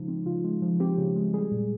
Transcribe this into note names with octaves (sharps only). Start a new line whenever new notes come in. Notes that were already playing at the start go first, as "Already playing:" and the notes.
Already playing: C#3 F3 G#3 D#4
C4
C#3 F4
G#3
F3
C4 G4
C#3
G#3
G3 G#4
A#2